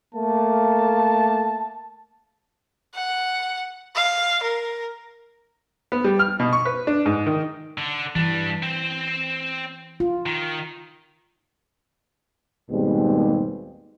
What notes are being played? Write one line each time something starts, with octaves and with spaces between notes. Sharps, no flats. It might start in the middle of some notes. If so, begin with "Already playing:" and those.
A3 A#3 A5
F#5
F5
A#4
B3
G3
F6
B2
C#6
B4
D4
G#2
D#3
D3
G2 E3 D4
C4 C5
F4
D#3
D#2 G#2 B2 G3 G#3 C4